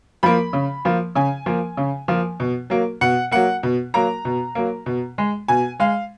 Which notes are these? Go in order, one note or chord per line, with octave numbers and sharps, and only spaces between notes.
F3 A#3 B5
C#3
F3 A#3
C#3 G#5
F3 A#3
C#3
F3 A#3
B2
F#3 A#3
B2 F#5
F#3 A#3 F#5
B2
F#3 A#3 A#5
B2
F#3 A#3
B2
G#3
B2 G#5
G#3 F5